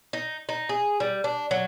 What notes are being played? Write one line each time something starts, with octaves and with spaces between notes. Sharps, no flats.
D#4
D#4
G#4
G3
D4
F#3